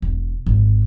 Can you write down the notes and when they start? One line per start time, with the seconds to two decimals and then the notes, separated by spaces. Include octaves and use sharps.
0.02 E1
0.47 G#1